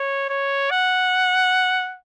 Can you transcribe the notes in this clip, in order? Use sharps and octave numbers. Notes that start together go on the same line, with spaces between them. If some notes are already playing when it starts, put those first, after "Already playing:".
Already playing: C#5
C#5
F#5